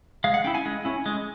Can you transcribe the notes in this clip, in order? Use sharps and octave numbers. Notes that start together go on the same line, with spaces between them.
G#3 F5
F#5
C#4 E4 G5
G#5
G#3
C#4 E4
G#3